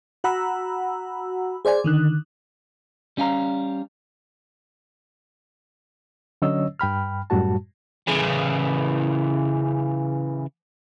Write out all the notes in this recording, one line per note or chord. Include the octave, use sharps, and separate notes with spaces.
F#4 F#5 A#5 B5 E6
G#4 C5 D5 G#5
D3 D#3 F#6
G3 C#4 F5 G5 A#5
D3 F#3 C#4 C#5 D#5 E6
G2 G5 B5 F6
F#2 A2 G3 F#4 A5
C#3 E3